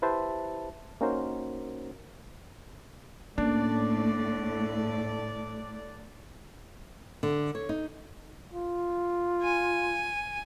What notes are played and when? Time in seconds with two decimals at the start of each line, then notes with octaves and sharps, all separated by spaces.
0.02 E4 G4 B4 C5 E5 A5
1.01 A#3 C#4 D#4 F#4 A#4 C5
3.38 A2 A#3 C#4 D4 A4 D5
7.23 D3
7.55 C#5
7.69 D#4
8.54 F4
9.42 G#5